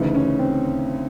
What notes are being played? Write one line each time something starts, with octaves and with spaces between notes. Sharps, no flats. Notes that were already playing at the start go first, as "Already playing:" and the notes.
Already playing: D2 C#3 E3 D#4
C#4
C4